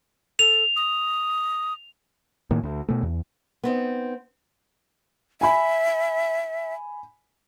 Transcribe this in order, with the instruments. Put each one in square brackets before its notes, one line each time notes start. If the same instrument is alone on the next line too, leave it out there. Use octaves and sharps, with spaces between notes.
[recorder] A4 [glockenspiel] F7
[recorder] D#6
[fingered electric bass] A2 D#3 A#3
D2
B2 A3
E2
[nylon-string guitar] B3 C4 D#4
[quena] E5 [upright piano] G#5 B5